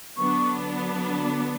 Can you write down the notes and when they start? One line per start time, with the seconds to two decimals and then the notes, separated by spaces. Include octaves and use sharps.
0.17 D3 F#3 B3 D4 C#6